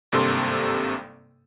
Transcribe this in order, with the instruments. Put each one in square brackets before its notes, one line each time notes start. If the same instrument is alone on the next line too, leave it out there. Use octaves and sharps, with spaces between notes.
[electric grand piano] G#1 G2 C3 A#3 A4 C6